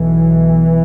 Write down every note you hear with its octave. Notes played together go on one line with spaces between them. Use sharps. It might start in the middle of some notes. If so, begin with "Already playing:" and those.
Already playing: B1 B2 E3